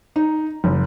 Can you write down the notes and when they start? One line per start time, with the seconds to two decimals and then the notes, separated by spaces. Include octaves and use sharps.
0.16 D#4
0.64 F#1